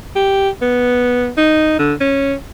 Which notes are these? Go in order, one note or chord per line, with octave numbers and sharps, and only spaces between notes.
G4
B3
D#4
D3
C#4